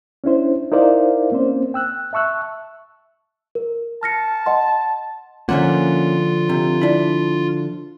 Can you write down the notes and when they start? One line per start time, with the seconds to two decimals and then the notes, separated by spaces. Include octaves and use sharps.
0.24 C#4 D4 E4 C5
0.72 D#4 E4 A#4 C5 D5 F5
1.32 A#3 C4 C#4 C5
1.74 G5 E6 F#6
2.13 E5 A5 C#6 E6 F#6
3.55 A#4
4.03 A5 F6 A#6 C#7
4.46 D#5 F#5 C6
5.49 D3 F3 A#3 C#4 F4 E5 F#5
6.49 C3
6.81 D4 E4